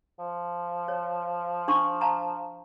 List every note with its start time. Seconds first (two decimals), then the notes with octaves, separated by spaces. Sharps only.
0.19 F3
0.88 C#5
1.68 D4 C6 C#6
2.01 F5 A5 A#5